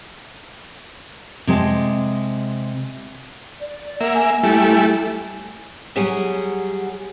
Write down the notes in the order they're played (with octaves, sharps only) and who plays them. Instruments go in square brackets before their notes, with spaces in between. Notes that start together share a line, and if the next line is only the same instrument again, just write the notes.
[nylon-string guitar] C3 G#3 A5
[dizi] D5
[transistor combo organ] A#3 E5 [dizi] F#5
[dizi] G#5
[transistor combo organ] G3 A3 E4
[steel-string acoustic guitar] F#3 G3 G#4 F#5 G#5